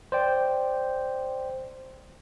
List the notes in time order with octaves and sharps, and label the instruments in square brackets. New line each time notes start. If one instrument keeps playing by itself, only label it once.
[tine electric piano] C5 D5 G5